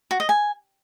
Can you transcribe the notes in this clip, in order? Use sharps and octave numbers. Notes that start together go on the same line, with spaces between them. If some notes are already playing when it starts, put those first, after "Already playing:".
F#4
D#5
G#5